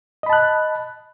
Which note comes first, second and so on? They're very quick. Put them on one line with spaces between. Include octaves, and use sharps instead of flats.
D#5 B5 A5 F#6